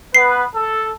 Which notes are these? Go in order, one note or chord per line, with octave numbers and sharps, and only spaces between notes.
B3 B4 C7
A4